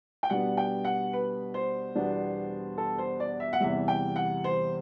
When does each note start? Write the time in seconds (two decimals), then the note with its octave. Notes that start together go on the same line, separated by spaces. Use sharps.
0.23 G5
0.30 B2 G3 B3 D4 F#5
0.57 G5
0.85 F#5
1.13 B4
1.54 C5
1.95 E2 B2 G3 B3 D4
2.78 A4
2.98 C5
3.20 D5
3.40 E5
3.53 F#5
3.60 E2 C3 E3 G3 E5
3.88 G5
4.16 F#5
4.44 C5